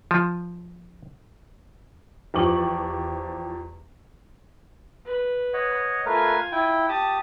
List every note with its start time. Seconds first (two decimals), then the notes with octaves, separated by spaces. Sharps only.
0.11 F3
2.34 E2 F3 G4 C#6 D6 F#7
5.06 B4
5.54 C#5 D#5 F#5
6.06 A3 F4 A#4 B4 G#5
6.52 E4 G5
6.89 G4 A5 D#6